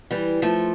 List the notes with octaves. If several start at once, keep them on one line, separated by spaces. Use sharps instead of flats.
E3 G3
F3 A3